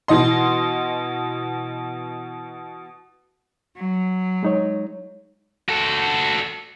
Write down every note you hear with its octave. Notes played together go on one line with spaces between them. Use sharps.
B2 E3 D#5 C6
F#3
G#3 D#4 C#5
F#4 A4